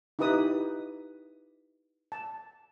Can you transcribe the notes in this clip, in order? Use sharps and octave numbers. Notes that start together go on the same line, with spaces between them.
D#4 E4 G4 B4 D#6
A5